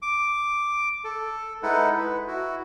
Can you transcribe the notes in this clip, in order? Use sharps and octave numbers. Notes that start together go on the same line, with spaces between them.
D6
A4
G#3 D#4 E4 A4 B4 F#5
B4
E4 F#4